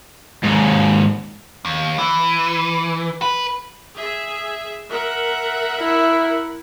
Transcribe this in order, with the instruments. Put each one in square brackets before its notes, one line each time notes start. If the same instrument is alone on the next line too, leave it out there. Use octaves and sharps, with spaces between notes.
[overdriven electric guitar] D#2 G#2
[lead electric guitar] D#2
E3
B4
[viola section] G#4 E5
A#4 E5 F#5
[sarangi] E4